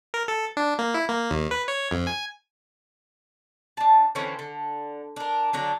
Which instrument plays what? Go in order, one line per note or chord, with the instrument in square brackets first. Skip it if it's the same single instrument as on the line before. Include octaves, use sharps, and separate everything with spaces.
[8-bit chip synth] A#4
A4
D4
A#3
E4
A#3
D#2
B4
C#5
F2
G#5
[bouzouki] D4 A5
D3 E3 C4 C#4
D3
D4 A#4
D3 F#3 D4